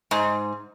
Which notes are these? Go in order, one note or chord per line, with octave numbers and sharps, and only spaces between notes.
G#2